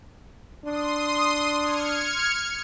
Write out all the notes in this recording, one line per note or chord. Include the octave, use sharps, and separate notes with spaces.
D4 C6 D#6
F6 G#6 C#7